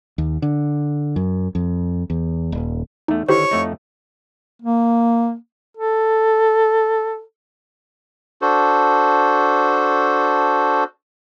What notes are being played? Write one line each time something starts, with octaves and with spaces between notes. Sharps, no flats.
D#2
D3
F#2
F2
E2
D#1
E2 A3 D#4
D3 D#3 E4 G4 C5 C#5
F2 A3 D#4
A#3
A4
D4 F#4 A4 C5